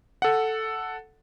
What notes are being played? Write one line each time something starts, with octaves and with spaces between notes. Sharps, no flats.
A4 F#5